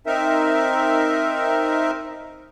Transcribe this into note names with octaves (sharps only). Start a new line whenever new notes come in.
C4 D#4 A#4 E5